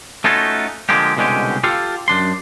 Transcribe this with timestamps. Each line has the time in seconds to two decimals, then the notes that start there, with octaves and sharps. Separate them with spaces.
0.24 A3 C#4 D#4 F4 F#4 A4
0.89 D3 F3 G#3 A#3 G4
1.17 C2 B2 D3 G#3 C#4 G4
1.63 F4 G4 A4 F5
2.08 F#2 D4 C6